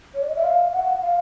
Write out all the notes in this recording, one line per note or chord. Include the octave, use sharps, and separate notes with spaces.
C#5
D5
D#5
E5
F5
F#5
F5